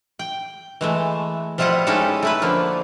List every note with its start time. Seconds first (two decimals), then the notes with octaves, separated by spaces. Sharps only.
0.19 G5
0.81 E3 G#3 A3
1.58 F3 G3 E4 F4 D#5 F#5
1.87 G#3 C#4 D#4 E4 G4 A4
2.22 A3 E4 B4
2.42 D3 F3 A#3